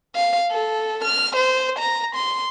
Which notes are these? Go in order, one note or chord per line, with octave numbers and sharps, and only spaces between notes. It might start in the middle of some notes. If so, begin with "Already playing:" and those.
F5
A4
F6
C5
A#5
C6